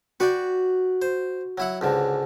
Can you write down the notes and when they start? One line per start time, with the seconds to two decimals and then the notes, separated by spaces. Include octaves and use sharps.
0.20 F#4 B4 D5 G5
1.02 C5
1.58 F#3 E4 F#5
1.81 C#2 G#2 D3